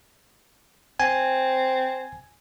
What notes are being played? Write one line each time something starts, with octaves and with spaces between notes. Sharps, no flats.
C4 G#5